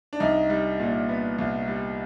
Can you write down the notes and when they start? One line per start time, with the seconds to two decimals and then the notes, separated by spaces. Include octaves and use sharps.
0.13 D4
0.20 C2 D#4
0.50 G3
0.80 A#2
1.09 B3
1.38 C2
1.68 G3